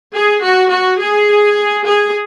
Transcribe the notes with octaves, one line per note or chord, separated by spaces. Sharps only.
G#4
F#4
F#4
G#4
G#4